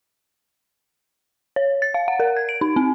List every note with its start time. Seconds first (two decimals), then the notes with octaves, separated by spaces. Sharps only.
1.56 C#5
1.82 A6
1.94 F5
2.08 F#5
2.20 A#4
2.37 G#6
2.49 D7
2.61 D#4
2.76 C4